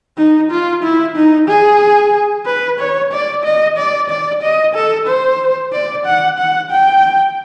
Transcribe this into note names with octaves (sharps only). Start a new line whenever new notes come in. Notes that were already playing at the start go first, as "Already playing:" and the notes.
D#4
F4
E4
D#4
G#4
B4
C#5
D5
D#5
D5
D5
D#5
A4
C5
D5
F#5
F#5
G5